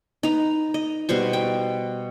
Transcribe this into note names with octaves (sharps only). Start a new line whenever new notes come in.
D#4 B4 A#5
D#5
B2 G3 C5 C#6
G5